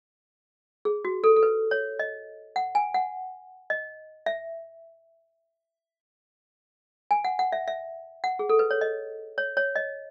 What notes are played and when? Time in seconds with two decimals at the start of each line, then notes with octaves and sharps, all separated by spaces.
0.85 G#4
1.05 F#4
1.24 A4
1.36 A4
1.43 B4
1.71 C#5
1.99 D#5
2.56 F#5
2.75 G#5
2.94 F#5
3.70 D#5
4.26 E5
7.11 G#5
7.25 F#5
7.39 F#5
7.52 E5
7.68 E5
8.24 F#5
8.39 G#4
8.49 A4
8.59 B4
8.71 C#5
8.81 D#5
9.38 C#5
9.57 C#5
9.76 D#5